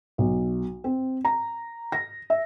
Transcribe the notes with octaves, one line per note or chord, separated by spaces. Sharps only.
B1
C4
A#5
A#6
E5